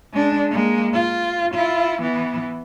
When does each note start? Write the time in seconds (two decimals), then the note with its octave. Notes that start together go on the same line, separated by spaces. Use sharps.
0.13 G#3 D4
0.50 G#3 A#3
0.93 F4
1.54 E4 F4
2.02 E3 B3